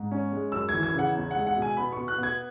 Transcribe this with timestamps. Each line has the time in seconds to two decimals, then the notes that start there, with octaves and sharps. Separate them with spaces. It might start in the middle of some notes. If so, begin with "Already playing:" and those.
Already playing: G#2
0.11 C#4
0.32 G#3
0.52 F#2 E6
0.69 G#6
0.74 E3
0.83 G#6
0.94 C#3 F#5
1.15 E2
1.31 F#5
1.36 G#3
1.46 F#5
1.56 B2
1.62 G#5
1.77 B3 B5
1.92 C#6
1.98 B2
2.08 F#6
2.18 B3 G#6